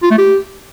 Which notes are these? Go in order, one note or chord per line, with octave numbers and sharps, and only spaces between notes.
F4
A3
G4